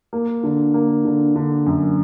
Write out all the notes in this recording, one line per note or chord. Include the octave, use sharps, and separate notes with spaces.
A#3
D3
A#3
D3
D3
F#2